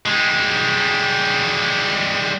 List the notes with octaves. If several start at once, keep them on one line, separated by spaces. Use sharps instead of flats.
G3 G#3